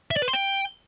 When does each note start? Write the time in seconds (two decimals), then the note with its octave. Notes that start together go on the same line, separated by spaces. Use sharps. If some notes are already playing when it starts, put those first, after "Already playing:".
0.11 E5
0.16 D5
0.22 B4
0.28 C6
0.33 G5